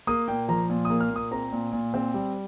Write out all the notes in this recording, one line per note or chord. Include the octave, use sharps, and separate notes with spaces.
A#3 D#6
A#2 G5
F3 A#5
A#2
D#6
A#3
F6
A#2
D#6
C4 A#5
A#2
A#2
C4
G3